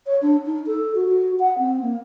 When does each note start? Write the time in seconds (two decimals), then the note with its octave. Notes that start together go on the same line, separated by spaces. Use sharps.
0.06 C#5
0.21 D4
0.45 D#4
0.66 A4
0.94 F#4
1.08 F#4
1.39 F#5
1.58 C4
1.81 A#3